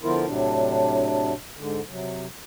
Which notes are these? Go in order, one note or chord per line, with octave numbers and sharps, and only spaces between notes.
D3 F3 B3 E4 F4 A#4
A2 C3 F#3 D4
G#2 D3
C3 F#3